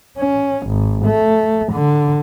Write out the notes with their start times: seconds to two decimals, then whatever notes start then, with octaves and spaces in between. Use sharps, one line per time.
0.18 C#4
0.68 G#1
1.06 A3
1.73 D3